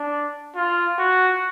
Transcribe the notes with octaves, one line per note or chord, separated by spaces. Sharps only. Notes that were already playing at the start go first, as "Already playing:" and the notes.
Already playing: D4
F4
F#4